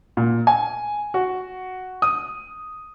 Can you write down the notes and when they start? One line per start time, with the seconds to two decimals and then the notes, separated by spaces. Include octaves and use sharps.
0.17 A#2
0.47 G#5
1.14 F#4
2.02 D#6